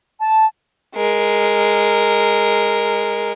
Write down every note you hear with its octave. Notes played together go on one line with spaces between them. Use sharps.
A5
G#3 A#4